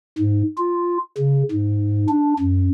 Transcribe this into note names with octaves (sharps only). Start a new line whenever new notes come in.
G#2
F4
C#3
G#2
D4
F#2